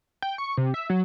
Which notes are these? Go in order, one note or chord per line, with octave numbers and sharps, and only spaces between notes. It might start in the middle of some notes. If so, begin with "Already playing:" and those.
G5
C#6
C3
E5
F#3